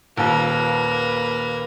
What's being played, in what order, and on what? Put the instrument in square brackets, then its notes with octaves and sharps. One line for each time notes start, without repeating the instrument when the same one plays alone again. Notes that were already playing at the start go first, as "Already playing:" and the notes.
[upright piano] D#1 D#2 [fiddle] A#3 B4